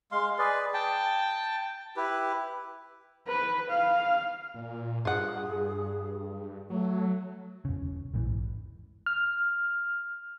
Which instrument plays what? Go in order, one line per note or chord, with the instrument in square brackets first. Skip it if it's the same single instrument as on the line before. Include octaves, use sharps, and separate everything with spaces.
[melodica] G#3 F5 C6
G#4 B4 D5
G5 A5
E4 G4 B4
[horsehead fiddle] B4
F5
[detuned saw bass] A#2
[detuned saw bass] G2 [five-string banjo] F4 F#5 [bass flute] G#4
[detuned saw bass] F#3 [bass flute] A3
[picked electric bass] E1 C#3
A#1 G#2 E3
[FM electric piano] F6